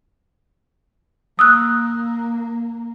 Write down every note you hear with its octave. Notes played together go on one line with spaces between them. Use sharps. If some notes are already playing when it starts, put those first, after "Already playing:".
A#3 D#6 E6 F#6